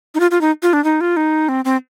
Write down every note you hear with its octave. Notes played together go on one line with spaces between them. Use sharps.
D#4
F4
F4
D#4
F4
D4
D#4
F4
D#4
C4
C4